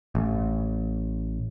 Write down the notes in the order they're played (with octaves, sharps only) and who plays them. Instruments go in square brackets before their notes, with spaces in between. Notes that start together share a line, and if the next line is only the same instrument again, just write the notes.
[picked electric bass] A1